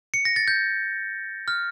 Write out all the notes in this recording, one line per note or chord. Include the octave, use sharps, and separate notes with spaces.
C#7
A#6
A6
G6
F6